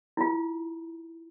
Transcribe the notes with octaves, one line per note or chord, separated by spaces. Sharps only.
E4 F4